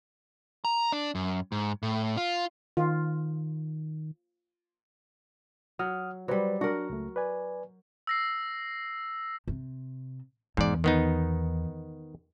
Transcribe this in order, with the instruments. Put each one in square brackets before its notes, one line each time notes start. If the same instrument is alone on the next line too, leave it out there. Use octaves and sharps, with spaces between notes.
[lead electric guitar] A#5
D4
F#2
G#2
A2
F4
[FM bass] D#3 [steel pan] F4
[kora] F#3 [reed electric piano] F#5 D#6 F6
[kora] F#3 G3 [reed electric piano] B4 C5 D5
[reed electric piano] D4 [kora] F#4 A#4
[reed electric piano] C#2 A3
B4 D5 G#5
[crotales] E6 A#6 C7
[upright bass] C3
[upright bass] E2 [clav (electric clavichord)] G#2 D5
[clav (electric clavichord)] D#3 B3 D#4